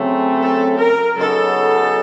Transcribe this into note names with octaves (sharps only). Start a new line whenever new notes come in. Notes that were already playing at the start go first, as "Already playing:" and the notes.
Already playing: C#3 F#3 A3 C4
A4
A#4
C#3 F#3 B3 D#4 A4